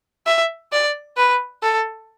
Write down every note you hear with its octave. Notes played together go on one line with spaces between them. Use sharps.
E5
D5
B4
A4